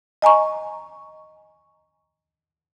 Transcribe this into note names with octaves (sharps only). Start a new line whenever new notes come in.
D#5 G#5 A#5 C#6